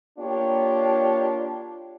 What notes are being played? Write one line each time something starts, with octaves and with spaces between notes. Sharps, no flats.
A#3 D4 F4 G4 C#5